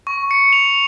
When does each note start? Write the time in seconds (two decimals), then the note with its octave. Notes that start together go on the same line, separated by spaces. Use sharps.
0.07 C#6
0.31 C#7
0.53 F7